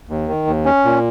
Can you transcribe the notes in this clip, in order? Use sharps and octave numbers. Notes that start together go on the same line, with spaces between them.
D#2
D#3
D#2
C#4
A#2